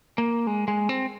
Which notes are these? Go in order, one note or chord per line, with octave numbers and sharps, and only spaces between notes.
A#3
G#3
G#3
C4